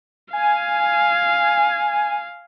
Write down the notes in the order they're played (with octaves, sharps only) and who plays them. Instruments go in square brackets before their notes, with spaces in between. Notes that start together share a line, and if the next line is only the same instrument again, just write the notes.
[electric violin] F5 [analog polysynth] G#5